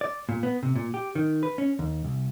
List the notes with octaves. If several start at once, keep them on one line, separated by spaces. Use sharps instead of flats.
D5
A#2
B3
C3
A#2
G4
D#3
B4
C#4
D#2
C2